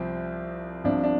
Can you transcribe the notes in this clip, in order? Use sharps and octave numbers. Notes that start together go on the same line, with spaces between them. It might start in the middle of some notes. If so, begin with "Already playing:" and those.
Already playing: C2 C3 F3 C4
C2 C3 F3 D4
D4